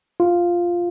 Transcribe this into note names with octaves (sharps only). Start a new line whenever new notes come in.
F4